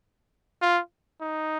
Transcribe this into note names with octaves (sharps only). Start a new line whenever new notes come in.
F4
D#4